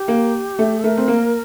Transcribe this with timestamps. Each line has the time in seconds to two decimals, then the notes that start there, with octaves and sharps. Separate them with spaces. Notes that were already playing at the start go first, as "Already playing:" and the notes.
Already playing: G4
0.08 A#3
0.59 A3
0.83 A3 A#4
0.98 C4
1.08 A#3